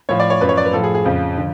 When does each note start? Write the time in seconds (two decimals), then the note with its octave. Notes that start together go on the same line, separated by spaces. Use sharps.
0.09 A2 F3 C#5
0.20 D5
0.30 C#5
0.41 F#2 F3 B4
0.49 C#5
0.57 D5
0.65 B4
0.73 A2 F3 A4
0.84 G#4
0.95 G#4
1.05 F2 C#3 F3
1.37 D3 F3